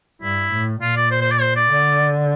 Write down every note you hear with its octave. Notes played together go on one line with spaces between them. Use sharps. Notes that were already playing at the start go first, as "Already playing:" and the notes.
G2 E4
A2
A#2 F4
D5
C5
C5
D5
C5
D5
D3